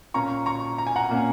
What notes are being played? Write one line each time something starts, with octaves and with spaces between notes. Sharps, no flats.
A#2 A#3 C#4 A#5 C#6
A#5 C#6
A#5
G#5
F#5 A#5
A#2 A#3 C#4